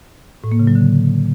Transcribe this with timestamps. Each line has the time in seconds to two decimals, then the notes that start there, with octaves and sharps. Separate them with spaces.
0.44 A2
0.52 A#3
0.60 C#3
0.67 F#3
0.75 D3